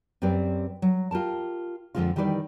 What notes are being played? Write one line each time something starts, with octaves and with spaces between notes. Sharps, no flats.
F#2 C4 G4 B4 D5
F#3
F4 G4 A#4 A5
F2 G#2 D3 F3 G#3 F4
D#3 E3 G3 B4 D5